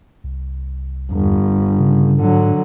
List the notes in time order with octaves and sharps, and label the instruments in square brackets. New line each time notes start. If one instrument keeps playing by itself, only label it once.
[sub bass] C2
[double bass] G1 [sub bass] E2
[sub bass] D1
C#3
[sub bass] G#2 [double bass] D3 F#3